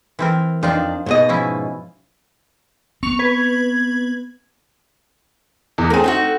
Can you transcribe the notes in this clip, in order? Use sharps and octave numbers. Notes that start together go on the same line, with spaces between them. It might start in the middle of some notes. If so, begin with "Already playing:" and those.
E3 C4 A#4
F2 D4 D#4 F4
G#2 B2 D#5
F3 C#4 E4
B3 C4 C#6 F7
B4 G#6
E2
A3 C4 G#4 A#4
D#4 E4 F#4